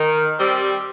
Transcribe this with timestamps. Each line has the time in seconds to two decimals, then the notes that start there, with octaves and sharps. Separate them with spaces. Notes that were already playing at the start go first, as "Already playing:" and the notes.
Already playing: D#3
0.38 G3 C4